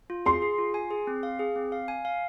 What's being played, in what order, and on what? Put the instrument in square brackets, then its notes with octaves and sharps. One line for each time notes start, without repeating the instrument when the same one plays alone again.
[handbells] F4
[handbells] G#4 [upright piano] C6
[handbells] G#4
F4
G#5
G#4
C4
F5
G#4
C4
F5
G#5
F5